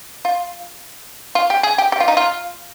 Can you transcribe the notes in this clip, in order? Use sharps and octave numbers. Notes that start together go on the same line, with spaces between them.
F4
F4
G4
G#4
G4
G4
F4
D#4
F4